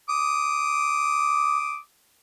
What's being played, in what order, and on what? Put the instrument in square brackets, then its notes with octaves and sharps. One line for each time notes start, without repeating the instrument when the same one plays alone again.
[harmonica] D6 D#6